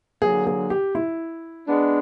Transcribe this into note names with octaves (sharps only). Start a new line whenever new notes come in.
D3 F#3 A#3 G#4
G#4
G4
E4
G#3 B3 D4